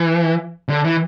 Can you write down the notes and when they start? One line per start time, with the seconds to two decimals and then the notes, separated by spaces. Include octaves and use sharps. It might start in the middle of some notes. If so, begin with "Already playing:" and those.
Already playing: E3
0.69 D3
0.84 E3